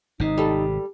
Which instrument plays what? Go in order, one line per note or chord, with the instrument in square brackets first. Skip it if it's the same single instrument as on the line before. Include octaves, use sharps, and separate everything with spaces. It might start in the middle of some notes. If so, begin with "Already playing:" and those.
[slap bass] G#1 C3 [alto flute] D#4
[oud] G3 A4